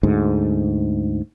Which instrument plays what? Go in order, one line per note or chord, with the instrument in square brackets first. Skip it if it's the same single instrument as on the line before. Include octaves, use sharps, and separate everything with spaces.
[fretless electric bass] D2 G#2